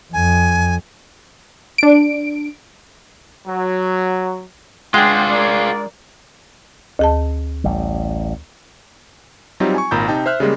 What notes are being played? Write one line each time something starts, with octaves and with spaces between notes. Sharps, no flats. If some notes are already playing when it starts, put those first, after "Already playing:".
F2 G#5
D4 D7
F#3
G#3 D4 F4 G#4 F#5 G5
A#4 D5
D2 G#4 A5
A1 G3
F#3 G3 C4 D#4 F4 G4
G#5 C#6
G#1 A#2 A#5 B5 G6
C3 D#4 G5 A5
C5 E5 F6 F#6
C#3 G3 G#3 A#3